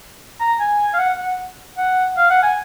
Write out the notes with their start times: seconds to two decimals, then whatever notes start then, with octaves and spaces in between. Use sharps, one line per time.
0.40 A#5
0.60 G#5
0.93 F5
0.99 F#5
1.18 F#5
1.77 F#5
2.17 F5
2.30 F#5
2.43 G#5